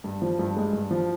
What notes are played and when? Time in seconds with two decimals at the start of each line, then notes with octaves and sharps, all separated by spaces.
0.04 G2
0.22 F3
0.39 G2
0.56 G#3
0.73 G2
0.91 F3